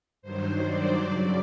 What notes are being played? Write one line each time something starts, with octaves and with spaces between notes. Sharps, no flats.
G2 D#3 F#3 C5
D5
F#2 C#3 F#3 D5